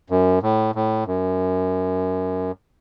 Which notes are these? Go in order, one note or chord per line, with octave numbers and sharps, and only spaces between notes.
F#2
A2
A2
F#2